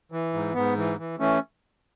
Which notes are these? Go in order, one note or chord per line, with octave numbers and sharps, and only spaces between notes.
E3
G#2
G#2 B3
E3
E3
E3 A3 C#4